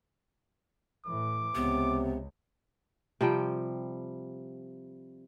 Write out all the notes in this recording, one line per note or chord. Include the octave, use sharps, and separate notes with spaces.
A2 E3 D6
C#2 C3 B3
C3 F3 G3 G5